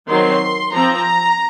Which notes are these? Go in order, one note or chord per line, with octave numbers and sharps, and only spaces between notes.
D#3 F#3 C4 C6
F3 C4 A#5